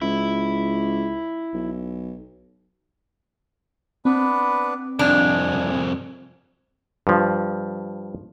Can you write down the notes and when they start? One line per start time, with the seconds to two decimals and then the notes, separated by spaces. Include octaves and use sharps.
0.02 C#2 E4
1.54 B1
4.05 B3 C4 D4 B4
4.99 C2 F2 D4 G#5
7.07 G2 F3